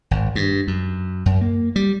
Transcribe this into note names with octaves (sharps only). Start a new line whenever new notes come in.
G#1
G2
F#2
F#2
A#3
G3